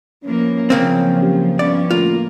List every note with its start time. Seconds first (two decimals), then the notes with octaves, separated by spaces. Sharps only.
0.24 E3 F3 A#3 C#4
0.70 C#3 F3 F#3 A#3 C4
1.22 G4
1.59 G2 F3 B3 C#4 D5
1.91 A2 D3 A#3 F4